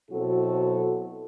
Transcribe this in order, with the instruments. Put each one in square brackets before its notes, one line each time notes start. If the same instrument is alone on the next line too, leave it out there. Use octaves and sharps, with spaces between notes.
[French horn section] B2 F#3 C4 E4 F#4 A4